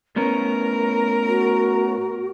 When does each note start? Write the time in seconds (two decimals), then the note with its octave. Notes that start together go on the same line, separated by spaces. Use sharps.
0.16 A2 B3 C#4 A#4 A#5
1.27 F#4